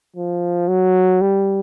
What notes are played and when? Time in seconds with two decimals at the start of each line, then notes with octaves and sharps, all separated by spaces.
0.16 F3
0.68 F#3
1.21 G3